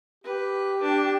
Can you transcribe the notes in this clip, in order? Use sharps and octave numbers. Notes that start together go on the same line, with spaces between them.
G4 B4
D4